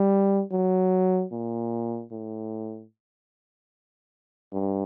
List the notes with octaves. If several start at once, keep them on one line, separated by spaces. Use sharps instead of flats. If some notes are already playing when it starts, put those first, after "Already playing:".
Already playing: G3
F#3
A#2
A2
G2